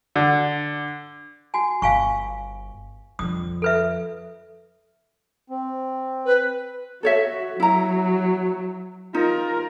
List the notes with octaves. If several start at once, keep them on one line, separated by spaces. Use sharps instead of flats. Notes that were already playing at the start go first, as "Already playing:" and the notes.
D3
F#4 G#5
G1 F5 G#5 C#6
F2 D3 D#6
A4 B4 E5
C4
B4
F#4 A4 C#5 E5
F#3 E4 A#5
D#4 F4 A#4